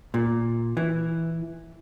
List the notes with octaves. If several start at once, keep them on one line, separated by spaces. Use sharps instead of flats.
A#2
E3